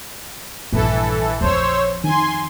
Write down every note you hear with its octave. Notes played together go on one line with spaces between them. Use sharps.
A#1 G2 E3 A4
F2 C5 C#5 E6
D#3 G#5 C6